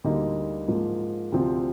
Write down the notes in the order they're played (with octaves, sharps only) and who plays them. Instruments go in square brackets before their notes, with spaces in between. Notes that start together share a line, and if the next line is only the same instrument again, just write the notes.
[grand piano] D2 D3 G3 A#3 D#4
G#2 F3 A#3
D2 C3 F3 C4